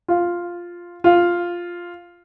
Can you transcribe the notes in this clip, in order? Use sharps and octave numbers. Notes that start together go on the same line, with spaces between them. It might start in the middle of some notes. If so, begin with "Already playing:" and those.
F4
F4